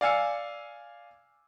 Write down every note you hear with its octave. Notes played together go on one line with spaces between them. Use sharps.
D5 F5 G#5 E6 C#7